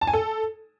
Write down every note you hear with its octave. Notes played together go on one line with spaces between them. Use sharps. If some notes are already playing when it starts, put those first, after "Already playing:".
A5
G#5
A4